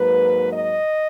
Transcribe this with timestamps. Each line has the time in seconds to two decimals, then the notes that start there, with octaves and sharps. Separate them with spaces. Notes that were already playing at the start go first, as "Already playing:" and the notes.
Already playing: G#2 F#3 A#3 B4
0.51 D#5